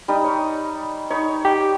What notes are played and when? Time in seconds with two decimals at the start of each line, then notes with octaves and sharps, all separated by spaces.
0.08 G3 D#4 D#6
0.24 C#5
1.10 D#4 C#5 B5
1.45 G4